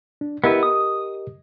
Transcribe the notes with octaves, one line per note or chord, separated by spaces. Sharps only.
D4
B3 E4 G4 A#4 B4 D#5
D#6